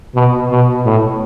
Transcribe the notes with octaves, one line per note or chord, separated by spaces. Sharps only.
B2
B2
A2